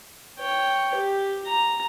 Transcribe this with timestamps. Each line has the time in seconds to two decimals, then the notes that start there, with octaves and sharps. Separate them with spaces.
0.39 C#5 G5
0.94 G4
1.46 A#5